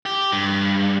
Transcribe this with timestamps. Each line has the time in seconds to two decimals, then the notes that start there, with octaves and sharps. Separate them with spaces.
0.06 G4
0.32 G2